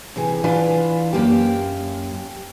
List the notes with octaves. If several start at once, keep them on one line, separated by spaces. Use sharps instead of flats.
C3 E3 G#4
E3 D4 F4 B4
F#2 A#3 G4